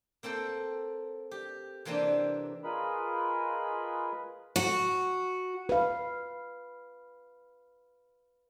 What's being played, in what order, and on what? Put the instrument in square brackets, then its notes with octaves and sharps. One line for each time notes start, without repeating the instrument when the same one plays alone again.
[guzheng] A#3 C4 A4 C5 G5
G4
C3 E3 A#3 C4 D4 G5
[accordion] F4 G#4 A#4 B4 D#5 B5
[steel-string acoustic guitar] F#4
[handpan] B4 F5